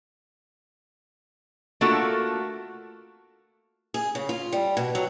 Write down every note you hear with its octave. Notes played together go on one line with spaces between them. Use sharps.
A3 A#3 D4 F4 F#4 A4
G#4
C#3
F4
G3
B2
F#3